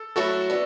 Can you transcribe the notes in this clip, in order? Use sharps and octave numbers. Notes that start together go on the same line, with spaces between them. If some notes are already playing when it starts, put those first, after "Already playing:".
Already playing: A4
F#3 A3 E4 F#4 A4
B3 D4